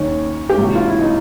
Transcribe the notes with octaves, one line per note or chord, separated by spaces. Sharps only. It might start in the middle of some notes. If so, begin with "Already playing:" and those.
Already playing: D#2 D#3 C#4
G4
C#2 C3 E3 F#4
F4
E4
D#4